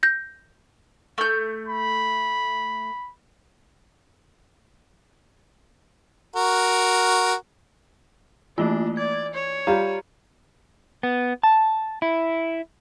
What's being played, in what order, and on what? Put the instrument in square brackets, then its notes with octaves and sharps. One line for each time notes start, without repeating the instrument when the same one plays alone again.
[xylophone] G6 A#6
[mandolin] A3 G6
[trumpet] B5
[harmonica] F#4 A#4
[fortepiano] E3 [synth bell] A3 A#3 F4 [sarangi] D4
[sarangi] D5 [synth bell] G#6
[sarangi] C#5
[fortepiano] G3 F4 [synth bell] A#5
[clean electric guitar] B3
A5
E4